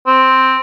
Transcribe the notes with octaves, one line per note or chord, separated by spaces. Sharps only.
C4